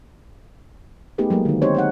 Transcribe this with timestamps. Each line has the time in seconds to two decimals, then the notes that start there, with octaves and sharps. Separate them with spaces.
1.18 A3 B3 D#4 G4 G#4 B4
1.30 F#3 G#3 A#3 B3
1.45 D3 D#3
1.62 C4 D#4 G4 C5 C#5
1.74 D#4 C#5 F#5